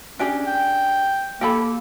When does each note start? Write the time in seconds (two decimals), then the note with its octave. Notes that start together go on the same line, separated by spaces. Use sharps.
0.19 C#4 D4 G4 G#4
0.47 G5
1.41 A#3 G4 A4 B5